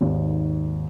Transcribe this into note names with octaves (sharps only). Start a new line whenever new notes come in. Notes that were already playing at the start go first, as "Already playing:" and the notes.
G#1 D#2